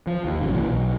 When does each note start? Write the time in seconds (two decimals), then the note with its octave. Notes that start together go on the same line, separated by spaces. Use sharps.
0.07 F3
0.25 D#2
0.40 G#1 F#2 C#3 F3
0.54 C2 A#2 E3
0.66 B1